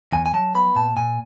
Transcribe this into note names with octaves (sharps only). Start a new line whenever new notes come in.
E2 G#5
G#5
F#3 A5
B3 B5
A#2 A5
A#2 G#5